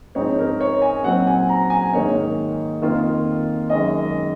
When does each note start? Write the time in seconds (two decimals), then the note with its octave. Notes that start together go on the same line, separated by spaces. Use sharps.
0.15 G#2 F3 C4 D#4 C#5
0.38 A#4
0.61 C#5
0.82 G#5
1.04 A#2 F#3 C4 D#4 F#5
1.27 G#5
1.49 A#5
1.70 G#5
1.92 G#2 D#3 A#3 C#5
2.82 F2 D#3 A#3 F4
3.70 F#2 D#3 G#3 C#4 D#5